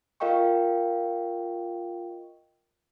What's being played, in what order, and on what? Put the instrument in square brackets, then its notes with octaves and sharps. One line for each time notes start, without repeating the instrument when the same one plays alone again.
[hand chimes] F4 A#4 D#5 F5 G5 C#6